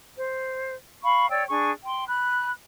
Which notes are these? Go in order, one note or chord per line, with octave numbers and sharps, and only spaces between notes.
C5
F5 B5 C#6
C#5 D5 G5 E6
D4 G#4 C#6
G5 C6
B5 F#6